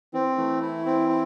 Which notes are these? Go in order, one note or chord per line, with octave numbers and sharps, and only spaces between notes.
E3 C4
E3 A3
E4
C4
E4